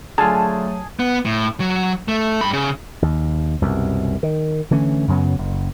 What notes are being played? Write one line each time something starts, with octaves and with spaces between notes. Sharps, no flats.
D3 F#3 A3 F4 G#4 A5
B3
A2
F#3
A3
G2 B5
C#3
D#2
C2 F#2 B2
D#3
D3 E3 A3 C#4
F#2 C#3 F#3 B3
F#1